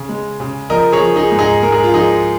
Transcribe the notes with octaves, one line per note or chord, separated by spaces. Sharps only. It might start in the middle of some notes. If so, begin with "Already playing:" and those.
Already playing: C#3
G#3
C#3
F3 A#4 D#5
G#4 C#5
F3
D#4 G#4
G#2
D#4 G#4
G#3 A#4
G#4
F4
F3 D#4 G#4